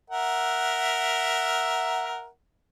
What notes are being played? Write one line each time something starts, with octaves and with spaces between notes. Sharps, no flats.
A#4 E5 F#5